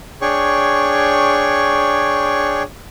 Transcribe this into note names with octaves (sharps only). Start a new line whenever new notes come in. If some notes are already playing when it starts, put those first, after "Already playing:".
D4 G#4 C#5 G5 C#6